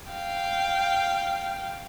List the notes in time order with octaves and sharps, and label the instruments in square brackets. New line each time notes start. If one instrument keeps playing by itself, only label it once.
[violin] F5 G5